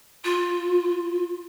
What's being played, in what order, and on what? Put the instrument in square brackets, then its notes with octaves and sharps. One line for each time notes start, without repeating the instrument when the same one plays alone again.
[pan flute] F4